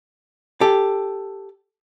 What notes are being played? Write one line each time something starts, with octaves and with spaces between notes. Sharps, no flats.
G4 A4